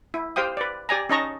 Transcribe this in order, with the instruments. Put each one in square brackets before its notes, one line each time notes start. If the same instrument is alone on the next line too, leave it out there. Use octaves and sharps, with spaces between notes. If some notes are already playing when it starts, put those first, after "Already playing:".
[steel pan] E4
G4 C5 F5 G5 D#6
B4 D5
G4 D5 G#5 A#5
C#4 D#4 D#5 A5 A#5 C#6